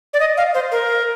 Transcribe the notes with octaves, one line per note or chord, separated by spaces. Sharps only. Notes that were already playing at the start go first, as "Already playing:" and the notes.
D5
D#5
F5
C5
A#4